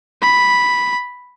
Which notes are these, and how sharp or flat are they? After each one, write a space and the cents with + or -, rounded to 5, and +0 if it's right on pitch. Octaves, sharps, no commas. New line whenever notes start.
B5 -5